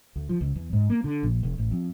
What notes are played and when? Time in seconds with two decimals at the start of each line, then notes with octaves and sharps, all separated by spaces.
0.16 D2
0.29 F3
0.41 C#2
0.56 E2
0.73 G#2
0.90 A#3
1.04 D3
1.23 A#1
1.43 F1
1.58 A1
1.71 F2